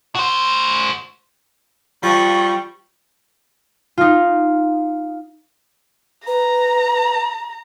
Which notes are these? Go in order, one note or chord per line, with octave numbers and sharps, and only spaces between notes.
F#4 C5
F3 G3 C#6
D#4 F4
B4 A#5